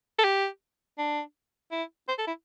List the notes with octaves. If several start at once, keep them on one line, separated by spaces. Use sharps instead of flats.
A4
G4
D4
E4
C5
A4
E4